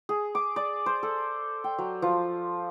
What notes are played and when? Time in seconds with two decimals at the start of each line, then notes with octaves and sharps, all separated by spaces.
0.09 G#4
0.35 D6
0.56 D5
0.86 C5
1.03 A4
1.64 G5
1.79 F#3
2.02 F3